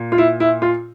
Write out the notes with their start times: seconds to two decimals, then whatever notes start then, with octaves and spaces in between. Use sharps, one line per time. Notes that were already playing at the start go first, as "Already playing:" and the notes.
Already playing: A#2
0.12 F4
0.18 E4
0.40 E4
0.62 F4